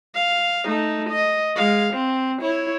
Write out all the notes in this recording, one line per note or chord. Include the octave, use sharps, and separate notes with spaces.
F5
A3 D#4
D#5
G#3 F5
C4
E4 C#5